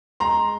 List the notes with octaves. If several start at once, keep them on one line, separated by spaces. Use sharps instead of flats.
G#3 A#5 C6